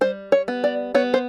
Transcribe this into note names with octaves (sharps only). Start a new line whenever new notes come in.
G3 C5
C#5
B3
D5
B3 C#5
C5